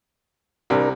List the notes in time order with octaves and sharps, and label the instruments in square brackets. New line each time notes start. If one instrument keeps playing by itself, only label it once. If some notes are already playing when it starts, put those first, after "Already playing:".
[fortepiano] C2 C3 [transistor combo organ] D4 A#4